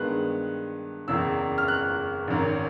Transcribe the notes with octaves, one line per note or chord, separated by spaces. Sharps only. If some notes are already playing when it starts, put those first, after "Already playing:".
Already playing: G2 D#3 G#3 B3 F#6
F#1 E2 C#3 E6
F6
F#6
G#1 F#2 D#3